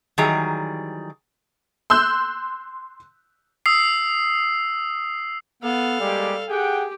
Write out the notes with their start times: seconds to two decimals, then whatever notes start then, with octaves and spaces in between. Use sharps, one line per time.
0.18 D#3 E3 F#3 G3 G#4 A#5
1.90 C6 E6 F#6 G6
3.66 D#6 E6 C7
5.63 B3 A4 F5
6.00 G3 G#3 A#3 G4
6.49 G4 G#4 F#5 G5